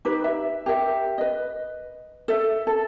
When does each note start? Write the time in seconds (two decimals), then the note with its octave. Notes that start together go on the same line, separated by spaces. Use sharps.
0.05 D#4 G4 B4
0.24 E5
0.66 G4 A#4 E5
1.18 B4 D#5
2.28 A4 E5
2.67 A4